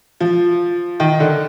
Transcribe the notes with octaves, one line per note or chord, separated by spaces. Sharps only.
F3
D#3
D3